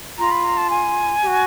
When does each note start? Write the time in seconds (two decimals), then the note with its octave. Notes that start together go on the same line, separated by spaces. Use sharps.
0.18 F4 A#5
0.31 B5
0.44 A#5
0.57 A5
0.70 G#5
1.23 G4
1.27 F#4